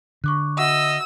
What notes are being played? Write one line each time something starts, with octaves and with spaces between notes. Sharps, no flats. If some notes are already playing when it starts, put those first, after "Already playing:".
D3 C#6 D6 F#6
F#4 D#5 E5 F#5 E6